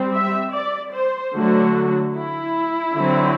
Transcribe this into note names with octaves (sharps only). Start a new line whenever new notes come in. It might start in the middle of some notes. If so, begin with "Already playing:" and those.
Already playing: G3 C4
E5
D5
C5
D3 F#3 A3 F#4
E4
D3 F#3 C4